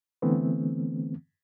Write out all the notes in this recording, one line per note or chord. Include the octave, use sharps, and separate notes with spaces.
D3 E3 A3 B3 C4